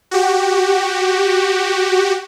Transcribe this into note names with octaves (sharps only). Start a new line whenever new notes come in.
F#4 G4